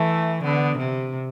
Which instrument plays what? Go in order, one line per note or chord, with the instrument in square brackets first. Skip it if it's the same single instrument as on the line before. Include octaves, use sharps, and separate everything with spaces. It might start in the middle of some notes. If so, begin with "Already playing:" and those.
Already playing: [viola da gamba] E3 [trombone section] A3
[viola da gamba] D3 [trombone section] B3
[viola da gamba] C3